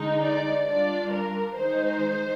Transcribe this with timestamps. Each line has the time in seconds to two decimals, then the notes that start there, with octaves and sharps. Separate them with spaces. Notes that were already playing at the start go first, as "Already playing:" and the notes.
Already playing: D3 G#3 D#4
0.21 D5
0.67 G3 D4 F4 D5
1.11 A#4
1.56 D#3 G#3 D#4 C5